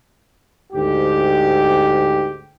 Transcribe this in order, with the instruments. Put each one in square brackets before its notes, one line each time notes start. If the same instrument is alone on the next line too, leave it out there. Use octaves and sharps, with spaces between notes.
[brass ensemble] D2 G#2 G4